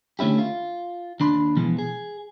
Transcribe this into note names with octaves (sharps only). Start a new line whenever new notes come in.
D3 A3 C#4 E4 G4
F4
D#2 D4 B5 C6
B2 E3 F3 G#3
G#4